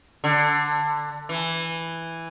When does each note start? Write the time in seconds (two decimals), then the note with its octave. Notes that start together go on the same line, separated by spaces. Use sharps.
0.24 D3
1.29 E3